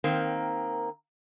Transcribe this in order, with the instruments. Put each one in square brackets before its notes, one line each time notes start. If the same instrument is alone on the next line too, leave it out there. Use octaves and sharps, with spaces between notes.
[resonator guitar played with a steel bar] D#3 A#3 C4